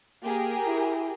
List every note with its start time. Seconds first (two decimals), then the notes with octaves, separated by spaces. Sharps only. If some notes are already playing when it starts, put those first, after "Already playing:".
0.24 A#3 G4 G#4 A#4
0.66 E4